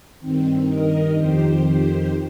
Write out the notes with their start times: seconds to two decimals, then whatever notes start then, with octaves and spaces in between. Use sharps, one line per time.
0.20 G2 D#3 C4
0.68 A#4 D#5
1.16 F2 D#3 G4 C5
1.65 G4 C5